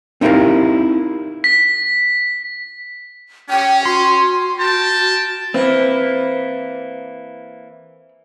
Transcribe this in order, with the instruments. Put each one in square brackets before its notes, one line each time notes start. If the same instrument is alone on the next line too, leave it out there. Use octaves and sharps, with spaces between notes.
[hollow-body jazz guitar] C4 D#4 E4 G4 A#4 F5
[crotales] B6
[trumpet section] C#4 [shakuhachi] G5
[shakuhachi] F#4 [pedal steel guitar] C6
[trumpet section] A#4 G5 A5
[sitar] E3 A#3 B4 [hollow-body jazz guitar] C4